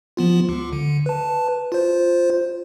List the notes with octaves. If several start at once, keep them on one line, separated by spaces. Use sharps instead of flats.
F3 B3 F4
C#2
D3
B4 A5
F4 C5